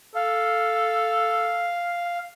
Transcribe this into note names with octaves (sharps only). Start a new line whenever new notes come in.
A4 F5